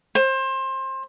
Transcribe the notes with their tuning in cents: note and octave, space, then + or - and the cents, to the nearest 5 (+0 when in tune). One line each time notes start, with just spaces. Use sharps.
C5 +25